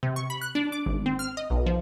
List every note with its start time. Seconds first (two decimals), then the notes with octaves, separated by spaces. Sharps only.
0.03 C3
0.16 C#6
0.30 B5
0.41 F#6
0.55 D4
0.72 D6
0.86 G#1
1.06 C4
1.19 F6
1.37 D#5
1.50 B1
1.66 F3